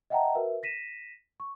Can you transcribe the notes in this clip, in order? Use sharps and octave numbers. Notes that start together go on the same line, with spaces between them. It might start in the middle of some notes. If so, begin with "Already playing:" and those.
D#5 E5 F#5 G5 A5 A#5
F#4 A#4 B4 E5
A#6 B6 D#7 E7
C#6